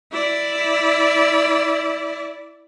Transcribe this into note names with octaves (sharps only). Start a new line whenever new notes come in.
E4 D5